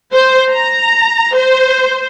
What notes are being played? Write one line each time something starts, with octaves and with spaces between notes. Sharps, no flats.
C5
A#5
C5